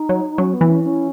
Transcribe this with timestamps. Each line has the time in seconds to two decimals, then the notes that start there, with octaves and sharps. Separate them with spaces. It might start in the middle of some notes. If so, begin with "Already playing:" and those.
Already playing: D#4
0.09 F#3
0.38 F#3 C#4
0.53 B3
0.61 E3
0.70 C#4
0.84 C#4